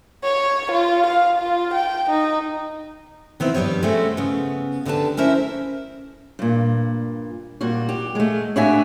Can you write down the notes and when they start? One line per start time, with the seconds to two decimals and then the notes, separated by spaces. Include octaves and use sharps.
0.24 C#5
0.72 F4
1.07 F5
1.38 F4
1.74 G5
2.10 D#4
3.40 D#3 B3 C4 E4
3.54 G2 G3 B3 G4 C#5
3.83 G#3 A3 C4 C#4 F#4
4.17 C#3 B3
4.85 D2 D3 G4 A#4 B4 A5
5.17 C#4 E4 A#4 C5 E5
6.39 G2 A#2
7.61 A#2 G3 F#4
7.89 G4
8.15 G#3 A3
8.56 A2 D4 F#4 G4 E5 G#5